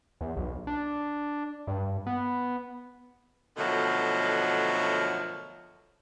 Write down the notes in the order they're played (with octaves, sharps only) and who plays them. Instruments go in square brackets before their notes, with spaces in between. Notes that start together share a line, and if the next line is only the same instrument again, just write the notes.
[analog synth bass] E2
B1
D4
G2
B3
[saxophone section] B2 D3 D#3 F3 F#3 A3